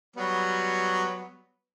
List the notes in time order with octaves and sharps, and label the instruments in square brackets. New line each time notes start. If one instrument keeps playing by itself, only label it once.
[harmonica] F#3 G3 B3